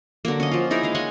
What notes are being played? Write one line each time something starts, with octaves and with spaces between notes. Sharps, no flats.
D3 F#3 A#3
C#4 D#5
F3 F4
D#4 E4 G#4 A#4
G#3 D#5 F5
C#5 D#5 F#5 G#5